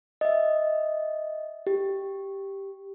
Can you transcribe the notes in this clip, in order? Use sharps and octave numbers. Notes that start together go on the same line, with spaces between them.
D#5 E5
G4